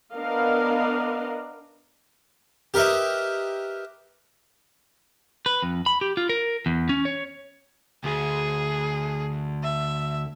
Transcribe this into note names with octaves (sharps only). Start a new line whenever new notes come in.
B3 D4 A#4 D#5 F5
G4 A#4 B4 D#5 E5
B4
F2
B5
G4
F4
A#4
E2
C#4
C#5
D2 G#4
E5